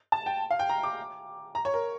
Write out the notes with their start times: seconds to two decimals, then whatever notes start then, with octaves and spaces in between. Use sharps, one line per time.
0.12 A5
0.26 G5
0.50 F5
0.59 G5
0.69 A#5
0.83 D6
1.55 A#5
1.65 C#5
1.74 A#4